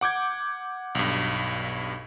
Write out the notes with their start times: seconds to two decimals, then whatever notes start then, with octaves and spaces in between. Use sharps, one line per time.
0.01 F#5 D6 G6 G#6
0.95 B1 G2